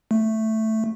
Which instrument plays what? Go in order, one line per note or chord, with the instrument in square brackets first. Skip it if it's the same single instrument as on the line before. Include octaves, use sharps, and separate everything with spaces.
[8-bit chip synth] A3